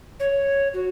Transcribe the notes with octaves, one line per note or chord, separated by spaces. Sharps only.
C#5
F#4